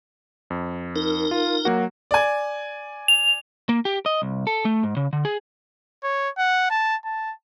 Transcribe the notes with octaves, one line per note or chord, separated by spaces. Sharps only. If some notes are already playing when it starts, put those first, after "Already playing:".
F2
D#4 A#4
F4
F#3 A#3 F#4
D5 G#5
F7
A#3
G4
D#5
C2
A4
A3
G#2
C#3
D3
G#4
C#5
F#5
A5
A5